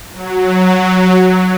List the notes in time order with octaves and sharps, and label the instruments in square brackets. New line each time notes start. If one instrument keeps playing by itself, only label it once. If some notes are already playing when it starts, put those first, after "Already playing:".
[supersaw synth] F#3